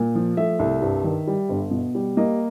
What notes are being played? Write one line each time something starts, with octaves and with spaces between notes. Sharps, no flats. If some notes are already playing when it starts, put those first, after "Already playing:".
Already playing: A#2
F3
A3 E5
C2
G2
D#3
G3
G1
B2
G3
A#3 D#5